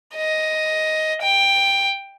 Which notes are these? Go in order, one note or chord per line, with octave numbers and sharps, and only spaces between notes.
D#5
G5